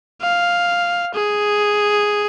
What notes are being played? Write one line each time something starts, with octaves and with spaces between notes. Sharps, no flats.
F5
G#4